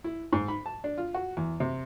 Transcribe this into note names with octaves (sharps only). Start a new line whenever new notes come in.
E4
G#2
B5
A5
D4
F4
F#4
E2
C3